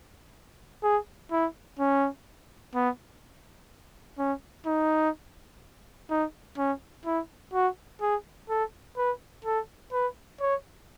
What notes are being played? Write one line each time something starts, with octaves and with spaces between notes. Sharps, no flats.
G#4
E4
C#4
B3
C#4
D#4
D#4
C#4
E4
F#4
G#4
A4
B4
A4
B4
C#5